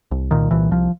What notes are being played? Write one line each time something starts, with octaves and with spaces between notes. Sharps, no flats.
C2
A#2 D#3
C2 E3
C2 F3